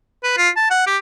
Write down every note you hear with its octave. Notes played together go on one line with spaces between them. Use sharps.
B4
F4
A5
F#5
G4